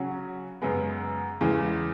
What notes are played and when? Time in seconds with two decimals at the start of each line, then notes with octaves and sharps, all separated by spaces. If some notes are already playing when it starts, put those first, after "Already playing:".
Already playing: C#3 F#3 C#4 F#4
0.62 F#2 C#3 G#3 B3
1.41 E2 C#3 E3 G#3